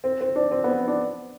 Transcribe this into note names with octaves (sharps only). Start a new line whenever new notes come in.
C4
C4
D4
C4
B3
D4